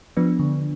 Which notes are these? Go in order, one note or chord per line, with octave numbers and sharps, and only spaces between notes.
F3 B3 D4
D3